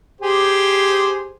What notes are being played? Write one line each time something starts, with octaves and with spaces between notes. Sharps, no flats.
G4 G#4 C5